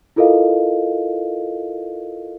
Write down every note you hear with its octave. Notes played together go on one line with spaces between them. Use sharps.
E4 F4 A4 A#4 D#5 F5